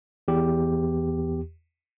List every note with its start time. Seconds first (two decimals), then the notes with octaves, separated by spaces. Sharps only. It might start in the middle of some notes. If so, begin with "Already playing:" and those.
0.28 E2 G4